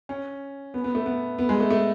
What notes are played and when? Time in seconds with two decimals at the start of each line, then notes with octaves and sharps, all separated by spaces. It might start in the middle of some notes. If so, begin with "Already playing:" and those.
0.09 C#4
0.74 B3
0.84 B3
0.95 A3
1.06 B3
1.38 B3
1.49 G#3
1.60 A3
1.70 A3